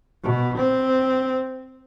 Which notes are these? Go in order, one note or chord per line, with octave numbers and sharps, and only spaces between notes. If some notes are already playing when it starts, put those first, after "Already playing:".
B2
C4